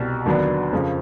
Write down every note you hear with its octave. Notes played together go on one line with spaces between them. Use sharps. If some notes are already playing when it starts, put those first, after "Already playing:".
Already playing: C2 B2 G3
D#2 D3 F#3 B3 D4
F2 C#3 F3